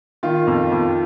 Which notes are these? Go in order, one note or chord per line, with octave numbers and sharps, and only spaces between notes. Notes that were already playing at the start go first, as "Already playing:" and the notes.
D#3 F4
F2
F2